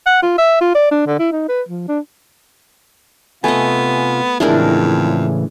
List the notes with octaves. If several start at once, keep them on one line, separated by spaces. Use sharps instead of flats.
F#5
F4
E5
F4
D5
D4
D3
E4
D#4
B4
F3
D4
C3 A3 B3 F4 D#5 G#5
F2 A2 C#3 E3 G#3 D4 E4 A#4